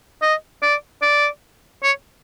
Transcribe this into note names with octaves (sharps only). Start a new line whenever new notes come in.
D#5
D5
D5
C#5